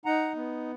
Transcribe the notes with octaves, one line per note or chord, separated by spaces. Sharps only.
D#4 F#5 A#5
B3